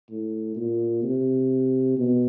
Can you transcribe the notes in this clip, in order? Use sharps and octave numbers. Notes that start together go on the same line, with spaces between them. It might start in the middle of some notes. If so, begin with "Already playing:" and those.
A2
A#2
C3
B2